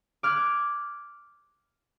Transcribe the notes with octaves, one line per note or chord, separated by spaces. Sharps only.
D6 F6 F#6 G#6